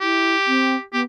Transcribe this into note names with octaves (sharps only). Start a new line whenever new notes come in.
E4 G4
C4
B3 G4